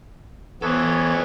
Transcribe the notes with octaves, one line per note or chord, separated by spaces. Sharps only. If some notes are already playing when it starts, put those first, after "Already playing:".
E3 B3 A4 C5 C#5